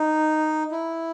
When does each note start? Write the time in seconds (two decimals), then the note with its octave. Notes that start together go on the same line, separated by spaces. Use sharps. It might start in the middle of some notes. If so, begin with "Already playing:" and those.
Already playing: D#4
0.72 E4